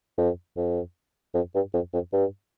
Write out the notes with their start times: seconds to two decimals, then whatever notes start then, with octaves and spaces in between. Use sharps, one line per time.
0.18 F2
0.57 F2
1.35 F2
1.55 G2
1.74 F2
1.93 F2
2.13 G2